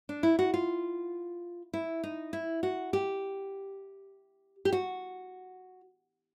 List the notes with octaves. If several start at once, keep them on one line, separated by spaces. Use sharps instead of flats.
D4
E4
F#4
F4
E4
D#4
E4
F#4
G4
G4
F#4